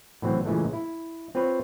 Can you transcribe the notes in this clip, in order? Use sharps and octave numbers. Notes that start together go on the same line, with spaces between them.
A2 C#3 E3 F#3 C4
A#2 C#3 E3 G#3 A3
E4
C4 F4 B4 C#5